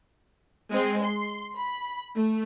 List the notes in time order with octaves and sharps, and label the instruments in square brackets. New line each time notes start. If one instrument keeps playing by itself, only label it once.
[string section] G#3 C4
C6
B5
A3